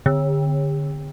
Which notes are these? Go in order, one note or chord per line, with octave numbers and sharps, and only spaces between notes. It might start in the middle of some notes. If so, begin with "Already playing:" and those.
D3